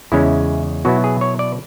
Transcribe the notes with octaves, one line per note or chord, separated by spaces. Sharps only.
E2 C#3 G#3 C#4 E4
B2 F#3 B3 E4 F#4
G#4
C#5
D5